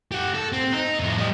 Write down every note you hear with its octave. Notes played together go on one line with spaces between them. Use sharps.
G4 F#5
A4
C4
D#4
F2 A2
G3 D#5